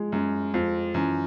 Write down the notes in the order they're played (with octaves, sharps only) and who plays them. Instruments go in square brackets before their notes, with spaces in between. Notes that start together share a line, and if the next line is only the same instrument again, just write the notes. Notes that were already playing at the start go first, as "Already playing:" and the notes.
Already playing: [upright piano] F3 G#3
[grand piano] F#2 [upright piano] G#3
[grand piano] F2 [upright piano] F3
[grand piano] F#2 [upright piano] E3